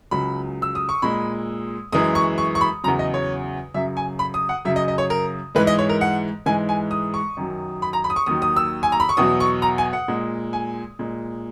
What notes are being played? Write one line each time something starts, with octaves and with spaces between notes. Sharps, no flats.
C#2 C#3 F#3 B5
E6
D#6
C#6
A#2 G#3 B5
F#2 E3 G#3 D#6
C#6
C#6
C#6
B5
E2 C#3 F#3 A#5
D#5
C#5
F#2 C#3 F#3 E5
G#5
B5
D#6
F#5
F#2 C#3 F#3 E5
D#5
D#5
C#5
A#4
G#2 E3 G#3 B4
D#5
C#5
A#4
F#5
G#2 E3 G#3 G#5
G#5
D#6
C#6
F#2 D#3 F#3
B5
A#5
B5
D#6
C#6
D#2 D#3 F#3 D#6
D#6
E6
G#5
A#5
B5
C#6
E2 B2 F#3 D#6
C#6
A#5
G#5
F#5
A#2 G#3
G#5
A#2 G#3